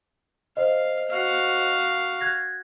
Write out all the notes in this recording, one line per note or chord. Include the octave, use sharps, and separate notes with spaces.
C5 D#5 F5
F#4 F5
F#6 G#6 A#6